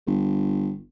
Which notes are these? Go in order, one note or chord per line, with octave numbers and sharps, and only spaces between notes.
G1